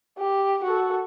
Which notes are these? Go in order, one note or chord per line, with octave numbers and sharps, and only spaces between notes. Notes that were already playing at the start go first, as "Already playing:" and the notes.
G4
F#4 A4